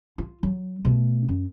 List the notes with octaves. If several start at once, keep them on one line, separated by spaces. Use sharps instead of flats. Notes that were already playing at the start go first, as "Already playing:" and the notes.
F4
F#3
B2 A3
F#2